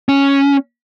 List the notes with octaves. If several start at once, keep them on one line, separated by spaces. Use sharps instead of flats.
C#4